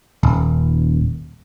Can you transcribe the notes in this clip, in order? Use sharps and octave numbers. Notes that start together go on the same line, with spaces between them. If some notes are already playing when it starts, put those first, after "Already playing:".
D#1